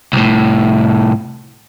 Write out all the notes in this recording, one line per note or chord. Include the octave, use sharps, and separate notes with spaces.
C2 A2